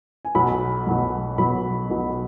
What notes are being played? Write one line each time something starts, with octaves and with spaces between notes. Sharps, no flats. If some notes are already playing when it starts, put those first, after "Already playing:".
G#5
B1 B2 F#3 B5
B1 B2 F#3
B1 B2 F#3 B5
B1 B2 F#3